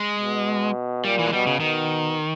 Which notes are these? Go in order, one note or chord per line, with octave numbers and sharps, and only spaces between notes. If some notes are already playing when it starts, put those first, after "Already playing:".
Already playing: G#3
B2
A#2 G3
E3
G#3
B2 G3
C#3
B2 D#3